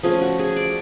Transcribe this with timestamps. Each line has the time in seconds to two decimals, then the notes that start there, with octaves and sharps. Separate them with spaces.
0.03 F3 A3 C#4 G#4
0.21 F#4
0.39 G#4
0.56 D5